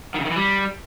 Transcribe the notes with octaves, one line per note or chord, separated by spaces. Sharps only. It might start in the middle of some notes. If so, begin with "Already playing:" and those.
D#3
C#3
D#3
E3
G3